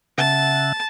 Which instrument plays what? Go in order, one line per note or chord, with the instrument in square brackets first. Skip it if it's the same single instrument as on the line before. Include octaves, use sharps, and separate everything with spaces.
[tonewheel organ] C#3 E5 F#5 [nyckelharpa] A5